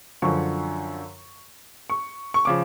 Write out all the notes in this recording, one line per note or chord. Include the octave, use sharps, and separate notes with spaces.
F#2 D3 F3 C#6
C#6
C#6
C#3 F3 D6